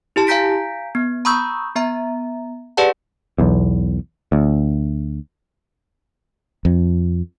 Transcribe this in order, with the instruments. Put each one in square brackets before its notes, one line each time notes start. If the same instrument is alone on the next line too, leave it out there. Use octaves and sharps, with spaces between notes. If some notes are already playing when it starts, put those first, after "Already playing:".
[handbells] E4 G4 A5
F5 G#5 A#5 G6 B6 D7
B3
A#5 B5 C#6 D#6 E6 G6
B3 E5 A#5
G4 G#4 B4 D5 F#5 A5
[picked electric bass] B1 E2
D2
[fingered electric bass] F2